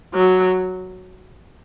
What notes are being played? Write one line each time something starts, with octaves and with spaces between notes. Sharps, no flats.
F#3